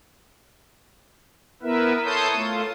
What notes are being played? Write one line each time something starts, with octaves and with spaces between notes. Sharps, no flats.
B3 E4 A#4 B4 E5
A4 C#5 A5 C6 D#6 G6
A3 F4